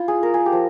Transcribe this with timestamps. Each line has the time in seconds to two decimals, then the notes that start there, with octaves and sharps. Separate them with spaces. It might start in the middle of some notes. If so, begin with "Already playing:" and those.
Already playing: E4 F4
0.08 G#4
0.23 A#3 A#4
0.34 G#4
0.46 G4
0.53 F3